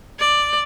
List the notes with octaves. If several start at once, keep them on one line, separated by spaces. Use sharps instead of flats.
D5